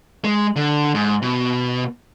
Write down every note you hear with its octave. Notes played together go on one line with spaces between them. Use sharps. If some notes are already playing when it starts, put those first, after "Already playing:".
G#3
D3
G#2
B2